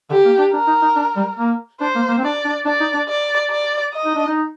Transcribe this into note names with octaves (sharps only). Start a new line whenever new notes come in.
D3 G4
A#3
D4
D4 A#4
D#4
D#4
D4
G3
A#3
D4 C5
A#3
A#3
C4
D4 D5
D4
D4 D5
D#4
D4
D5
D5
D#5
D#4
D4
D#4